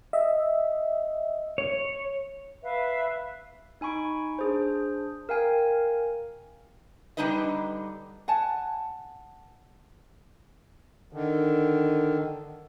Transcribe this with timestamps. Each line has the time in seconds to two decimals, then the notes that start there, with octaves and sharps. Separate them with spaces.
0.13 D#5 E5
1.58 C#5
2.63 B4 E5 F5
3.81 D#4 G#5 B5 C#6 D7
4.39 D4 G#4 C5
5.29 A#4 F5 G5 G#5
7.17 D3 G3 D4 D#4 B4 D#5
8.28 F#5 G#5 A5
11.13 D3 D#3